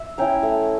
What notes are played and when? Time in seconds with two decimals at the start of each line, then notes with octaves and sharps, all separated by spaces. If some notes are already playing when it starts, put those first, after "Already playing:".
Already playing: E5
0.18 C#4 E4 G5 A#5
0.43 A3